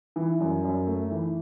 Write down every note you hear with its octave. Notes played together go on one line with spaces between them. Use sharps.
E3
F#2
F#2
A3
E3